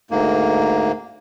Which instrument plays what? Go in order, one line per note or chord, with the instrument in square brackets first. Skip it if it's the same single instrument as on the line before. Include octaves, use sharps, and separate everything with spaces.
[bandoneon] D2 G#2 A#3